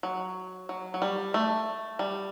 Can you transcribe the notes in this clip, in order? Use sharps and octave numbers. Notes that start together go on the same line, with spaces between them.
F#3
F#3
F#3
G3
A3
G3